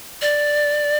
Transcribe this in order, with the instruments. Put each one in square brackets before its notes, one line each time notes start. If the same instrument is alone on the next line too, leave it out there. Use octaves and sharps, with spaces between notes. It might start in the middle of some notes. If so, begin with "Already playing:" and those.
[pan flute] D5